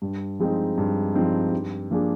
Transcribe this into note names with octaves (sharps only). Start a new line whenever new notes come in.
G2
F3 G#3 C4 D#4
G2
F3 G#3 C4 D#4
G2
F3 A#3 D4 G#4